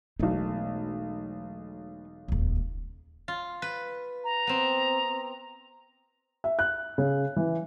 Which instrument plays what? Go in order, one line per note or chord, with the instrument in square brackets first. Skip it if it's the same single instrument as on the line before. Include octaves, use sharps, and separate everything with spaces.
[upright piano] E1 B1 [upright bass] A3 D#4
[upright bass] D#1 C#2
[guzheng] F4
B4
[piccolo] A#5
[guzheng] B3 C4
[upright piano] E5
F#6
C#3
E3